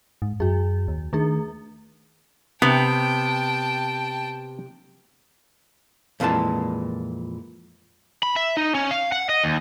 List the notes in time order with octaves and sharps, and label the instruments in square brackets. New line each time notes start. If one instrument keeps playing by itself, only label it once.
[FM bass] G#2
[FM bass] F#2 [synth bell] F#4 G#4
[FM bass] D#2
[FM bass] D#3 [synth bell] A3 D4 G#4
[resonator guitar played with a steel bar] C3 [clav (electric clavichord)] B3 [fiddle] G5 A5
[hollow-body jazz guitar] F2 A#2 E3 G#3 A5
[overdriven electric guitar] B5
E5
D#4
C#4
F5
F#5
D#5
D#2